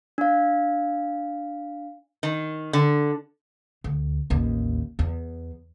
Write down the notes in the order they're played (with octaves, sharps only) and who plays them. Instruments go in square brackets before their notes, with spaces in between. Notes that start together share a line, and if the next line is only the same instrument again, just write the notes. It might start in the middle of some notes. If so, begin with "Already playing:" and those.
[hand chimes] D4 F5
[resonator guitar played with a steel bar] D#3
D3
[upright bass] D2
A1 D#2
E2